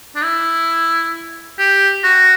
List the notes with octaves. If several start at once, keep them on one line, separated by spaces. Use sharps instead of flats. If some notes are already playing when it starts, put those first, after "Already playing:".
D4
E4
G4
F#4